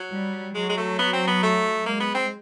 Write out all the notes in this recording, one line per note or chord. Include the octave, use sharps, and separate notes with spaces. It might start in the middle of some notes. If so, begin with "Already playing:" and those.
Already playing: F#3
G3
F#3 G#3
G#3
A3
B3
C4
B3
A3
G#3 A#3
B3
C4